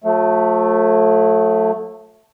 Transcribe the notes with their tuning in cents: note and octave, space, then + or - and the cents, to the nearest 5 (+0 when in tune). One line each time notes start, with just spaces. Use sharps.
F#3 -45 A3 +0